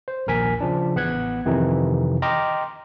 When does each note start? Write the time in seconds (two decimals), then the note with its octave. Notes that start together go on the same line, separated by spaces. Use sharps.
0.08 C5
0.27 A#1 D#2 A#4 G#5 B6
0.61 C#3 F3 D4
0.96 A1 B3 F#5 F#6 G#6
1.45 F2 C3 D#3 E3 D#4
2.22 D#5 G5 A#5 C6 D6 F6